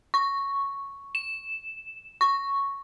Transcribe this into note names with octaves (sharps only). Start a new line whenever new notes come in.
C#6
E7
C#6